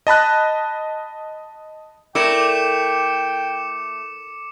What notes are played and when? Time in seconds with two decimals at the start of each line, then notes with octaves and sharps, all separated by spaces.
0.07 D#5 A5 B5 F#6
2.15 A3 E4 A#4 D5 G5 D6 C#7 E7